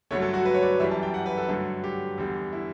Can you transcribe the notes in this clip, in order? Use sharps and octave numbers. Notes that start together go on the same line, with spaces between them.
G2 D3 F#3 A3 C#5
A4
F#4
B4
C#5
D5
F#2 E3 G3 E5
A5
G5
F#5
B4
A4
G2 D3 F#3 A3
G4
E2 D3 G3
E4